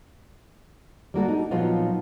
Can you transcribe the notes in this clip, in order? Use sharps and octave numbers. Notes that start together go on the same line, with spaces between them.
G3 A#3 F#4 A4
D#4
A#2 F3 F#3 B3 D#4 F4